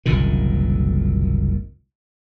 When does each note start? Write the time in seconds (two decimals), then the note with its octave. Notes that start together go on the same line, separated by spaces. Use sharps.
0.06 F#1 C2 A#2 D#3